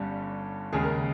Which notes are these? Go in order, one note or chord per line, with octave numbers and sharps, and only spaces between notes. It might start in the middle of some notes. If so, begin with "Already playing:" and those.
Already playing: G1 G2 G3 C#4
D#2 C#3 G#3 G#4
A#4